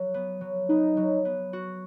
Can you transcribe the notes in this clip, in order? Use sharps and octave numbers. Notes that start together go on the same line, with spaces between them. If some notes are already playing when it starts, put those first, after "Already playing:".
Already playing: F#3
B3
F#3
B3 D#4
F#3
B3
F#4